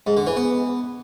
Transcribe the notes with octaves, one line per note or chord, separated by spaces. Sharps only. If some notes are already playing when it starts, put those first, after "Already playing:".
G#2
D3
E3
B3